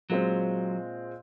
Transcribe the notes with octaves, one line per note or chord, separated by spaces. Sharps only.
A#2 F#3 G#3 C4